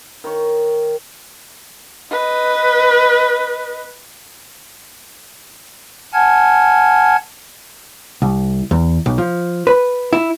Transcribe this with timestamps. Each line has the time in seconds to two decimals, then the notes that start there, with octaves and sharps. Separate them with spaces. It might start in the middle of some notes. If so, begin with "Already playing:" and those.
0.24 D#3 C#5
2.11 B4 D#5
6.13 F#5 G#5 A5 F6 G#6
8.22 C2
8.71 E2
9.06 B1
9.18 F3
9.67 B4
10.13 E4